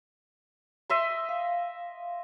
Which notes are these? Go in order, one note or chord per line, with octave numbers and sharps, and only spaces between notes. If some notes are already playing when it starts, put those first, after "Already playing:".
D#5 E5 C6
F5